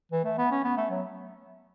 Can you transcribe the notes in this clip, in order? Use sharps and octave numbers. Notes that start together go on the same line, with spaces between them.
E3
A3
B3
C#4
B3
A3
F#3